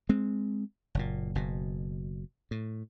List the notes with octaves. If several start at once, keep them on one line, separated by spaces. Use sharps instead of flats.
G#3 C4
F#1 A#2
F#1 B2
A2